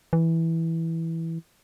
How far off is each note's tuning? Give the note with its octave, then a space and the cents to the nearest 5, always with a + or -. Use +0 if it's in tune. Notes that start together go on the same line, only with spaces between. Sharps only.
E3 -5